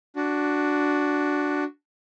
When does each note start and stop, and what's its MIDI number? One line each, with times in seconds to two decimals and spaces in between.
0.16 1.64 62
0.16 1.64 66